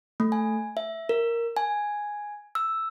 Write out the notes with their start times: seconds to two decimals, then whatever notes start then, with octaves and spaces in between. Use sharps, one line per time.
0.20 A3
0.32 G#5
0.77 E5
1.09 A#4
1.57 G#5
2.55 E6